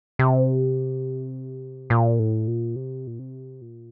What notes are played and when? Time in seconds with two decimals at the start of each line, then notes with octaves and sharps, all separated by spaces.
0.19 C3
1.90 A#2
2.19 A2
2.47 A#2
2.76 C3
3.07 A#2
3.19 C3
3.61 A#2